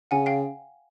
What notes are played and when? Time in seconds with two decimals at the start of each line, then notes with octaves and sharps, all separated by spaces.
0.11 C#3 F#5 G#5
0.26 F5 G5